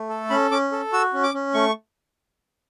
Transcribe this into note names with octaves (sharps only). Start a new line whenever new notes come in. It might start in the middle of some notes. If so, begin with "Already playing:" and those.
Already playing: A3
A4
C#4 B5
C#4 D6
A4
F#4 E6
C#4
D6
C#4
A3 C#6